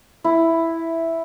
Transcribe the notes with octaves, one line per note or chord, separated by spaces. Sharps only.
E4